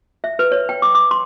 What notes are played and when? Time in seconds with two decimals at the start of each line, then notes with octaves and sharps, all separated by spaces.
0.24 E5
0.39 B4
0.52 C#5
0.69 G5
0.82 D6
0.95 D6
1.11 C6